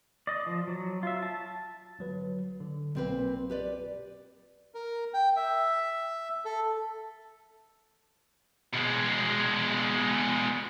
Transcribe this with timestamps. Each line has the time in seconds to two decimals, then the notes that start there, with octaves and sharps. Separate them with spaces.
0.27 D5 D#5
0.46 F3
0.68 F#3
1.03 F4 E5
1.23 A5
1.99 G1 F#3 B4
2.60 D3
2.95 B1 A#2 C4 B4
3.50 G4 B4 D5
4.74 A#4
5.14 G5
5.36 E5
6.45 A4
8.73 B2 G#3